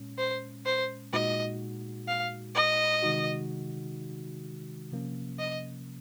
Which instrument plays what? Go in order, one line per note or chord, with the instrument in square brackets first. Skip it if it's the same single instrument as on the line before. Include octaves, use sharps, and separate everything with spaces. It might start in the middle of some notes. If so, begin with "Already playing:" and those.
Already playing: [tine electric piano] A#2 G#3 C#4
[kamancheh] C5
C5
[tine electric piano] A#2 G#3 D#4 F#4 [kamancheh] D#5
[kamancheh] F5
D#5
[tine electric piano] C3 D#3 G#3 D#4 F#4
C3 F3 A#3 C#4
[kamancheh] D#5